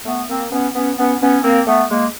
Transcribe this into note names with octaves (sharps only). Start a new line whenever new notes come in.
A3 B3
A#3 C4
B3 C#4
B3 C#4
B3 C#4
B3 C#4
A#3 C4
A3 B3
G#3 A#3